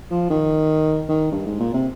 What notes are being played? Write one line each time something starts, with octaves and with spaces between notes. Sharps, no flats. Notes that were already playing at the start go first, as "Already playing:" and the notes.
F3
D#3
D#3
G2
G#2
A#2
C3